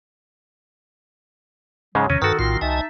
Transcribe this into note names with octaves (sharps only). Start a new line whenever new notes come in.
G#2 C#3 F#3 G#3
E2 C3 D#3 C#4
G2 D#3 F#4 A4 B4 A5
A#1 A2 C4 F4 A#4 C6
C2 D#4 D#5 E5 G#5 A5